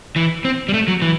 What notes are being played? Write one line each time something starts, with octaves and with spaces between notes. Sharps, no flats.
E3
C4
G3
A3
F#3
E3